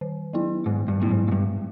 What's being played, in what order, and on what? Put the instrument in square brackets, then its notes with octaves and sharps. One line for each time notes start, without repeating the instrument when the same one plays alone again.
[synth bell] D#3
F#3 B3 E4
[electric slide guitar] G#2 [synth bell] D#3
[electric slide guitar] G2
[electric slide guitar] A2 [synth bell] F#3 B3 E4
[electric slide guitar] G#2
G#2
[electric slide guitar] G2 [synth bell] G#3